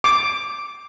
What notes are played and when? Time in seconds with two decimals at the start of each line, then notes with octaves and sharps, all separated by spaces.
0.04 D6